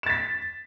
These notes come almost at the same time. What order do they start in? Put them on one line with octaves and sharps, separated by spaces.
E7 A6 B6